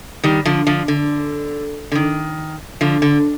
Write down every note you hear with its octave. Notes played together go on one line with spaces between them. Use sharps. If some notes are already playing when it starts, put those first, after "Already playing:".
D#3 G3
D3 F3
D3 F3
D3
D3
D#3
D3 F3
D3